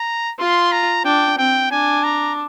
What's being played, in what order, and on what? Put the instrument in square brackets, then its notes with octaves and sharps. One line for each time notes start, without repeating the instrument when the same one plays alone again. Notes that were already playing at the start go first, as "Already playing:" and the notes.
Already playing: [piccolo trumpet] A#5
[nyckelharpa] F4 [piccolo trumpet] C6
[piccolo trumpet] A#5
[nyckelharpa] D4 [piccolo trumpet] G5
[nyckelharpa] C4 [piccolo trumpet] G5
[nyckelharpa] D4 [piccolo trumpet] G#5
[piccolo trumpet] A#5